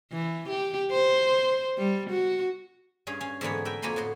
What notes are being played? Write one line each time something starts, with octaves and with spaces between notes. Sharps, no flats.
E3
G4
C5
G3
F#4
G2 C#4 G#4 F5
C#4 F5
G#2 D3 E3 A#3 B3 C#5
A#4 B4 E5 G5 B5
F2 A#3 F#4 G#5 B5 C6
A2 B3 F#4 C6